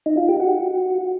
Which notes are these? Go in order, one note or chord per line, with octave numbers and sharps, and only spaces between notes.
D#4
F4
G4
F#4